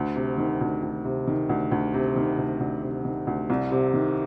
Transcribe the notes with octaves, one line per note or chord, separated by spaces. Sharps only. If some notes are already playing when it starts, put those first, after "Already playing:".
Already playing: D2
C3
D#3
D2
D2
C3
D#3
D2
D2
C3
D#3
D2
D2
C3
D#3
D2
C2
C3
D#3